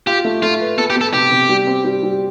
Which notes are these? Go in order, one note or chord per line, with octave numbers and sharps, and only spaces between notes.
F4 G4
A3
A3 F4
B4
B3 A4
G4
B3 A4
C3 G4
C3
G3
C4
G3
G3